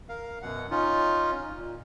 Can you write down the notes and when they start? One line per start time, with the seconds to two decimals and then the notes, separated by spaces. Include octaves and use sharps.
0.09 A#4 F5
0.42 F#2 B2 F#5
0.70 C#4 D#4 F4
1.57 A#2